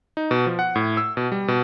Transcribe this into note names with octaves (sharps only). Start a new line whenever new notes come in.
D#4
B2
F3
F#5
A2
E6
B2
G3
B2